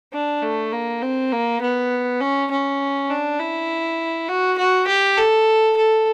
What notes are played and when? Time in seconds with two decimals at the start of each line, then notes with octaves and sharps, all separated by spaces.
0.13 D4
0.42 A3
0.72 A#3
1.02 C4
1.32 A#3
1.61 B3
2.21 C#4
2.51 C#4
3.09 D4
3.40 E4
4.28 F#4
4.58 F#4
4.87 G4
5.18 A4
5.77 A4